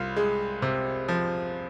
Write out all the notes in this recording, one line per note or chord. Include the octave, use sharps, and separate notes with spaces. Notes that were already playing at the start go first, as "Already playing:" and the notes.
Already playing: C2 F4
G#3
C3
F3